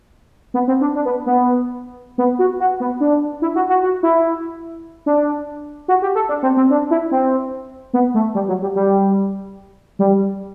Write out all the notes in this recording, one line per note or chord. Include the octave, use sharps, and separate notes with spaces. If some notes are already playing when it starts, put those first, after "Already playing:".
B3
C4
D4
D4
B3
B3
B3
F#4
F#4
B3
D4
E4
F#4
F#4
F#4
E4
D4
F#4
G4
A4
D4
C4
C4
D4
E4
C4
B3
A3
G3
F#3
G3
G3
G3